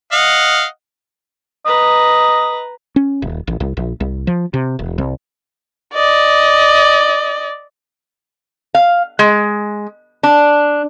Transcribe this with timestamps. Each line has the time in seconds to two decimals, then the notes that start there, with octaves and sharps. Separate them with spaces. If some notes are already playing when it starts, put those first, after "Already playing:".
0.12 D#5 F5 F#5
1.66 B4 D#5 A#5
2.96 C#4
3.22 D#1
3.47 A1
3.60 C2
3.77 A#1
4.00 C2
4.27 F3
4.54 C3
4.79 E1
4.98 C2
5.94 D5 D#5
8.75 F5
9.19 G#3
10.23 D4